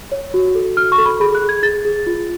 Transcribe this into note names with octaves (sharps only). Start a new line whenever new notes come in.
C#5
F#4
A4
F#4 F6
C#6
A4
B5
G#4 B5
F#6
G#4
G#6
G#4 A6
G#4
F4